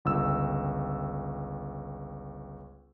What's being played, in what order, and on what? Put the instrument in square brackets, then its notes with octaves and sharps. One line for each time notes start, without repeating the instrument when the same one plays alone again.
[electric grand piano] G1 C#2 E6